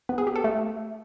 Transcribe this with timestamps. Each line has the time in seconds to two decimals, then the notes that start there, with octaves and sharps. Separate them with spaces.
0.09 B3
0.18 G#4
0.27 G4
0.36 A4
0.44 A3